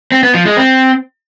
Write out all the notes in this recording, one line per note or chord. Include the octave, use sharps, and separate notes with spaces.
C4
B3
F3
G#3
C4